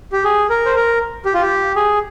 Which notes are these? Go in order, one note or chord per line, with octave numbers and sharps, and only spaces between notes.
G4
G#4
A#4
C5
A#4
G4
F4
G4
G#4